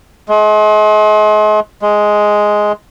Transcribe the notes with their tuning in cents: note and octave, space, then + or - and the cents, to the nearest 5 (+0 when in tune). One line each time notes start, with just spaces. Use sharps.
G#3 +40
G#3 +5